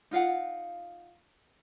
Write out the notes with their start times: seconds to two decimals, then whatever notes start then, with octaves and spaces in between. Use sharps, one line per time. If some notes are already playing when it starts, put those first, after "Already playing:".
0.11 D#4 F4 F5 F#5